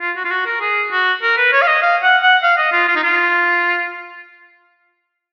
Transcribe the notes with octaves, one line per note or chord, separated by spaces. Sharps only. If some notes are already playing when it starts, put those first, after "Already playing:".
F4
F#4
F4
F#4
A#4
G#4
F#4
A#4
B4
C#5
F5
D#5
F5
F#5
F#5
F5
D#5
F4
F4
D#4
F4